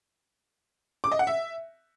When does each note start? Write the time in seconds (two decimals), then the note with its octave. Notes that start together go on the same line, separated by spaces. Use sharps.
1.04 D6
1.12 D#5
1.19 F#5
1.27 E5